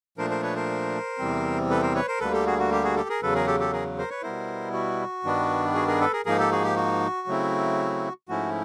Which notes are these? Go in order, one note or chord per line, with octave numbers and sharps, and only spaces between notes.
A#2 F3 A3 D4 A#4 C5
A#4 C5
B4 C#5
A#4 C5
E2 C3 E3 G3 C4
A4 B4
A#4 C5
B4 C#5
A#4 C5
D2 D3 G3 A#3 A4 B4
G4 A4
F#4 G#4
F#4
G4
F#4 G#4
G4 A4
G#4 A#4
E2 C#3 F#3 A4 B4
G#4 A#4
G4 A4
G4 A4
G#4 A#4
A#4 C5
B4 C#5
B2 G3 B3 E4 A#4 C5
F#4
G2 D#3 G3 B3 D4
F#4 G#4
G#4 A#4
A4 B4
G#4 A#4
G#2 F3 A#3 D#4 G#4 A#4
G4 A4
F#4 G#4
G4
F#4
C#3 F#3 A3 C4 E4
G#2 F3 A3 C#4 E4 F#4